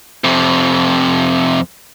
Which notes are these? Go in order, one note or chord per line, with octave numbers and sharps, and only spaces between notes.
F2 C3